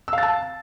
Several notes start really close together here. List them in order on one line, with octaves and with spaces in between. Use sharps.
E6 F5 A6 A5